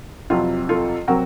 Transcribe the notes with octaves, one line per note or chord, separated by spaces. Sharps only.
F2 C3 F#3 F4
F4 A4
C3 F#3 C4 F#4 A#4